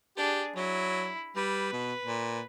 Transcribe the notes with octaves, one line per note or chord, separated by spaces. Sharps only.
D4 G4 G#4
F#3 E4
G3 B4
B2
A#2